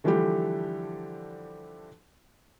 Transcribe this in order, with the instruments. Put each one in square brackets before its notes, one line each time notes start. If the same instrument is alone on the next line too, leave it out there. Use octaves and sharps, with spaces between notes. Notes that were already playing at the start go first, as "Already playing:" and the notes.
[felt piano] D3 E3 F3 G3 A3 G4